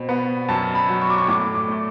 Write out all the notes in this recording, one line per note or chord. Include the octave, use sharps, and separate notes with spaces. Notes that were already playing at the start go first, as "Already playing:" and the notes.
Already playing: B2 C4
B3
F#2 A5
B5
F#3
C#6
D6
C#6
A2 D6
D6
A3